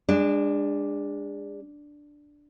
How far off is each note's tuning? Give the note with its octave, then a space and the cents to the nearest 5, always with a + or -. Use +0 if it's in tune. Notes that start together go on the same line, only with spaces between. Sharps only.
G#3 -35 D4 +0